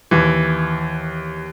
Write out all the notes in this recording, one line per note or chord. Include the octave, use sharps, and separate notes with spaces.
D#2 E3